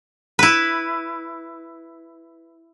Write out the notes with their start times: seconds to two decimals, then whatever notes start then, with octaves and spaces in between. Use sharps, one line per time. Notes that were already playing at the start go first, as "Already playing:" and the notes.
0.39 E4 B4